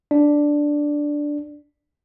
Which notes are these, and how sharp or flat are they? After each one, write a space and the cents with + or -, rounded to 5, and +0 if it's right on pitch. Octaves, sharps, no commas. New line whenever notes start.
D4 +0 D5 +0